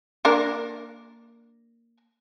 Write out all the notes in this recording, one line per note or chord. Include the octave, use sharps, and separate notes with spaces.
A#3 D4 A#4